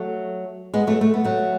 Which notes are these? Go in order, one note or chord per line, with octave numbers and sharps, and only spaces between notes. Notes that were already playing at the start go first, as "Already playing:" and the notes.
Already playing: F#3 A3
G#3 B3
F#3 A3
A3
B3
F#3 A3